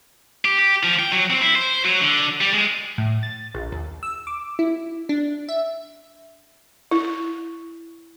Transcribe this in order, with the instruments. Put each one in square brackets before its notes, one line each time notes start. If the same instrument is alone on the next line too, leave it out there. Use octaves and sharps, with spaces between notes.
[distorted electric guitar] G4
G4
F3
G5
F#3
C4
E4
C5
F#3
D3
G3
G#3
[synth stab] A2
A6
A#1
D#2
E6
D6
E4
D4
E5
[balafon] E4